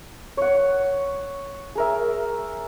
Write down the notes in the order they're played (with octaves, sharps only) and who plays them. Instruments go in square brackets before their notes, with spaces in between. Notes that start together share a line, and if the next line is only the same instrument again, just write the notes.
[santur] C#5 F#5
G#4 A#4 E5